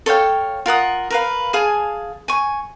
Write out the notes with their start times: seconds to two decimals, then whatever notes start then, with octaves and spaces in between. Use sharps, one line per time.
0.06 A4 C#5 F5 G5
0.66 F4 A#4 F#5 D#6
1.10 A#4 B4 F5
1.53 G#4 F5 G#5 A5
2.28 G#5 C#6